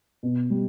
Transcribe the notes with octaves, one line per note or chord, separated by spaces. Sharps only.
B2
G3